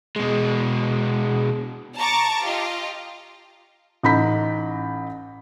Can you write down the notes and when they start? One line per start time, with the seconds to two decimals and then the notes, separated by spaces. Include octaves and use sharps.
0.16 B2 G#3
1.97 A5 A#5 C#6 D6 A6
2.43 F4 G4 D#5
4.03 A1 D#4 A#5 B5 G6 B6